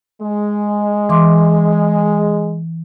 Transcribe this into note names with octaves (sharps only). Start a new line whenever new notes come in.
G#3
E3 C6 D6